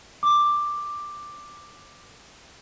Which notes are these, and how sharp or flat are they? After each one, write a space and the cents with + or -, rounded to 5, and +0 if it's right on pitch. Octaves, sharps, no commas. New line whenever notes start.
D6 +5